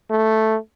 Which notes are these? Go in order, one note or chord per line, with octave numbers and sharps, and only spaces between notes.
A3